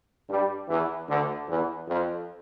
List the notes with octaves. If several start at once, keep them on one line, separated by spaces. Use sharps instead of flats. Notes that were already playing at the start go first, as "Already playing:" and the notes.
G2 G3
E2 E3
D2 D3
E2 E3
F2 F3